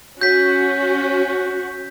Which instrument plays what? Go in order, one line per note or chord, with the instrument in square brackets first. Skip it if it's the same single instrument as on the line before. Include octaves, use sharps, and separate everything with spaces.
[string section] C#4 [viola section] F#4 [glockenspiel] G6 B6